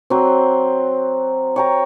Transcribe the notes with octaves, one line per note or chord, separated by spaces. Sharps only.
F#3 C4
C#5 G5 A#5